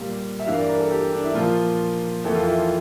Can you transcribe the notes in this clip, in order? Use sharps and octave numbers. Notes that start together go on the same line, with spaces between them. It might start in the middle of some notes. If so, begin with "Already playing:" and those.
Already playing: A#2 G3 A#3 F5
E5
G2 E3 A#3 F5
D5
A#4
A4
G4
D4
E4
A#2 F3 A#3 F4
F2 E3 A#3 A4
F4
E4
F4